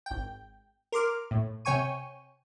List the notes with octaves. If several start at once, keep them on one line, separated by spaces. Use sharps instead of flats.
G#1 G5
A#4 C6 D6 F6
A2
C3 C#5 G5 G#5 C#6 D#7